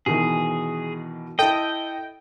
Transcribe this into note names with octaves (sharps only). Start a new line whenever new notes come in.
B2 D#3 E3 G#4
E4 A4 D#5 G5